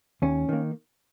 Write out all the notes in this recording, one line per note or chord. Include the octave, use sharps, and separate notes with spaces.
D#2 C#4
D#3 A#3